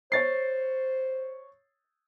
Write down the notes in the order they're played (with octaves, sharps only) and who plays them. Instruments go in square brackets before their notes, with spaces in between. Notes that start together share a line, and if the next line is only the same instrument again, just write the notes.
[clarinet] C5 [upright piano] C#5 A6 C7